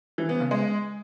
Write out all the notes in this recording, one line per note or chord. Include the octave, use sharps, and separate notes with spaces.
E3
B3
C#3
G#3